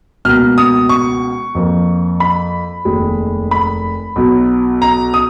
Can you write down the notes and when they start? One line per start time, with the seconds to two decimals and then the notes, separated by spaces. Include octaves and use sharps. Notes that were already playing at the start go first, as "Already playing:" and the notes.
0.25 C#2 B2 A#3 F6
0.58 D#6
0.89 C#6
1.55 F2 F3 A#3
2.20 B5
2.85 F1 D#2 D#3 G#3
3.51 B5
4.16 B1 B2 F#3
4.82 A#5
5.14 D#6